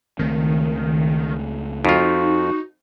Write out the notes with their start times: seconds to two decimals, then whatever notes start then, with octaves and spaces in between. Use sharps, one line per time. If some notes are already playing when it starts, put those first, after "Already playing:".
0.19 C#2 D#3 A3 C4
1.85 F2 D#4 F4 F#4